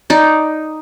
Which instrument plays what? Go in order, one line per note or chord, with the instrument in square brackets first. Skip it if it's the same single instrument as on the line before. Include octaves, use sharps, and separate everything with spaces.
[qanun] D#4 D5